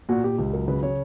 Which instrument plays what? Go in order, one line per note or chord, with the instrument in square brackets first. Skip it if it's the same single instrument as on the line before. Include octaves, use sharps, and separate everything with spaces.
[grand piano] A#2 F#4
A#2 G4
C#2 G4
F#3 A#4
C#3 B4
C#3 C#5